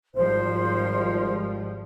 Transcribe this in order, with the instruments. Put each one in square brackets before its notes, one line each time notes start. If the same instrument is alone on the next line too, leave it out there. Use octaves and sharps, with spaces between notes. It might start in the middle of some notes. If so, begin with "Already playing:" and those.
[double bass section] G#1 F3 G3 [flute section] C5